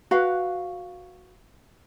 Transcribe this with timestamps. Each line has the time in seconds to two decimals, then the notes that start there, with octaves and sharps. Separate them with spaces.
0.11 F#4 B4 F5